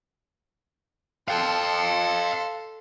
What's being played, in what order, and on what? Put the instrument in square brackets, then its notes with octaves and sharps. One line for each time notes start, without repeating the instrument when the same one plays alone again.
[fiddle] A4 C6 [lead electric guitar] F5 G5